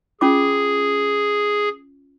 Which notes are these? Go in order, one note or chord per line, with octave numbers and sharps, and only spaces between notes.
C#4 F4 G#4 D6